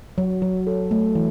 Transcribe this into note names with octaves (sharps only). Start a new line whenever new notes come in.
F#3
F#3
A4
A3
E3